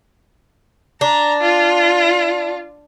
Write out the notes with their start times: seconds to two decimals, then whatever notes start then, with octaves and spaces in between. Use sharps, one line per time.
1.01 D4 A#5
1.41 F4